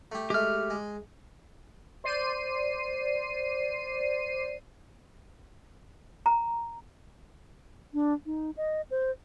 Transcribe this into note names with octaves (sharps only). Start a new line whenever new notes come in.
A3 G4
G#3 A3 G4 F6
G#3
C5 D5 C7 D#7
A#5
D4
D#4
D#5
C5